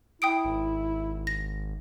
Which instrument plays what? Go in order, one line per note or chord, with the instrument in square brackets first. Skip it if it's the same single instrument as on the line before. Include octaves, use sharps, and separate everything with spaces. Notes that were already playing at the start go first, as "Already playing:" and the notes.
[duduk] E4 [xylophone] G5 D#6 D7
[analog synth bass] G#1
[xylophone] A#6